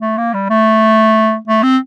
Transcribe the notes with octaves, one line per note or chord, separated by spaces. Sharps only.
A3
A#3
G3
A3
A3
C4